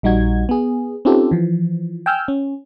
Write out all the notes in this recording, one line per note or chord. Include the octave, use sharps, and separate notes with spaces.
A#1 G3 D#4 F#4 G#6
B3 G#4
C4 C#4 D#4 F4 G4 A4
E3 F3
G5 G#5 E6 F6 G6
C#4